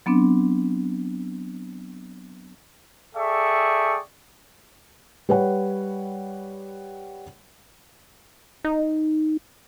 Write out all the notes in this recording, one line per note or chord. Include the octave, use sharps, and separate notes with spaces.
F#3 B3 C4 D4
G#4 A4 D5 E5 G5 C#6
G3 B4 C#5 F#5
D#4